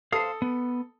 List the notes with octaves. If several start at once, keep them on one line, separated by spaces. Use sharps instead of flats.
A4 C5 F5 D#6
B3